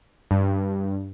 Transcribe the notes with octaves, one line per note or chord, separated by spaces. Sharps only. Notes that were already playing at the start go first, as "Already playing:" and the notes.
G2